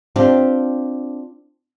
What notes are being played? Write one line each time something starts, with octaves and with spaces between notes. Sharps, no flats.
C4 D4 F4 G4